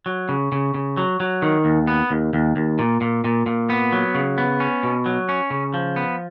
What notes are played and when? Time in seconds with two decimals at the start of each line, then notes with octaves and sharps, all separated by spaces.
0.06 F#3
0.29 C#3
0.52 C#3
0.74 C#3
0.97 F#3
1.20 F#3
1.42 D#3
1.65 D#2
1.87 B3
2.11 D#2
2.33 D#2
2.56 D#2
2.79 A#2
3.01 A#2
3.24 A#2
3.46 A#2
3.70 B3
3.92 F#3
4.15 C#3
4.38 B3
4.60 C#4
4.83 B2
5.06 F#3
5.29 C#4
5.51 C#3
5.74 F3
5.96 B3